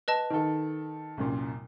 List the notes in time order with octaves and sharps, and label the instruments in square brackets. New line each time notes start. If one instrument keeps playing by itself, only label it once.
[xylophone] B4 D#5 A5
[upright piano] D#3 A4
C2 F#2 A#2